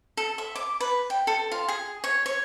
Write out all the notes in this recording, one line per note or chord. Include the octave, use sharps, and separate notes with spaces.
A4
E5
D6
B4
G5
A4
F4
G#4
C#5
C#5